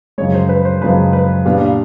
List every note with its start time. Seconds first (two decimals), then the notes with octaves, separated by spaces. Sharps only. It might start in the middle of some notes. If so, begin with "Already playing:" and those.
0.18 F#2 C#3 F3 G#3 C#5
0.34 C5
0.49 B4
0.65 C5
0.82 F#2 C#3 F3 G#3 B4
1.13 B4
1.45 A#2 G3 B3 D4 F5
1.61 F5